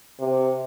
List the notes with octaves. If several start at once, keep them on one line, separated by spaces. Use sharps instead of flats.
C3